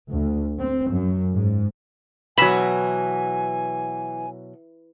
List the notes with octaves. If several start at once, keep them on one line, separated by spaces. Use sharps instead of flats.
D2
C4
F#2
G#2
B2 E3 F#3 G#5 B5 B6 E7